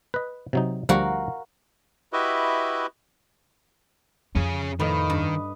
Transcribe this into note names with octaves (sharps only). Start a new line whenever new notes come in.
B4 D#5
C3 F#3 D#4
D2 F3 G3 F#4 A#4 F5
E4 F#4 G4 B4 D#5 E5
F2 C#4 G#4
A2 D#3 F3 B4 D#5
G2